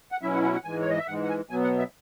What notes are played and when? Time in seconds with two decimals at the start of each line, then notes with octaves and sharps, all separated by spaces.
0.12 F#5
0.22 B2 F#3 C#4 E4 E5
0.33 F#5
0.44 F#5
0.54 F#5
0.64 G#2 E3 G#3 G#5
0.81 C#5
0.90 D#5
0.98 E5
1.07 G#2 E3 G#3 F#5
1.23 F#5
1.29 G#5
1.50 B2 F#3 B3 G#5
1.64 F#5
1.78 E5